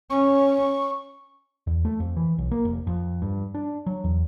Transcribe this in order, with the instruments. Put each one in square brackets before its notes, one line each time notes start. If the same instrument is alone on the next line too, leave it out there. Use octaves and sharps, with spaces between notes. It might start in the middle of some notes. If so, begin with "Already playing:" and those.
[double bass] C#4 [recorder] C#6
[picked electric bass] E2
A3
F2
E3
B1
A#3
F1
F2
G2
D4
F#3
E2